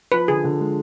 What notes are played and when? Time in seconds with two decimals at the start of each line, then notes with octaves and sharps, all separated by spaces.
0.12 F3 B4
0.28 D3 G#4
0.44 D3
0.60 G#3